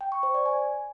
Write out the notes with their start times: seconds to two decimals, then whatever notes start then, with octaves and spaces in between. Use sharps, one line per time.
0.01 G5
0.12 C#6
0.23 C5
0.34 D5
0.46 G#5